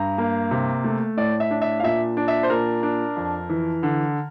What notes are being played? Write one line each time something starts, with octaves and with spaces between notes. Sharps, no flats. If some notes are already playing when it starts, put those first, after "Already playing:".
Already playing: G2 A#5
A#3
C3
A3
A2 D5
E5
D4
E5
F5
A#2 E5
D4
E5
C5
A#2 A#4
D4
F2
E3
D3